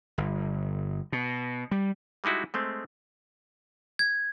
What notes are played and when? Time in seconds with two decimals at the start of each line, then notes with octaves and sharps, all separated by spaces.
0.18 G1
1.12 B2
1.71 G3
2.24 G3 G#3 D#4 E4 F#4
2.54 G#3 A3 C4
3.99 G#6